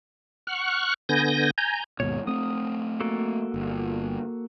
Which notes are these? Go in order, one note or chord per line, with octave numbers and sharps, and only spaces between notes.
F#5 C#6 F6 F#6
D3 B3 G#5 G6 A#6
G#5 A#5 G6
D#2 G#2 B2 C#5
A3 C4 D#6
A#3 F#4 A4
G1